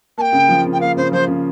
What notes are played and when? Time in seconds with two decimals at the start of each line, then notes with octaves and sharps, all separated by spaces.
0.18 A#3 A5
0.21 G5
0.33 C#3
0.49 F3
0.65 C#3
0.73 G5
0.80 A#3 F5
0.97 C#3 C5
1.12 F3 C5
1.28 C#3